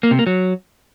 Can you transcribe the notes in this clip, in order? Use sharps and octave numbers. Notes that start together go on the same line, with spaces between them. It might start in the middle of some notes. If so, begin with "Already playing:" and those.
A#3
C3
A#3
F#3